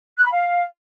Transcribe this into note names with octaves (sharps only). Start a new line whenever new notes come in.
F#6
B5
F5